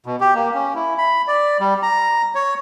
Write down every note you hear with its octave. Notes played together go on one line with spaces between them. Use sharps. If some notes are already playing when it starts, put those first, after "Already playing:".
B2
G4
A#3
C#4
E4
B5
D5
G3
A#5
C#5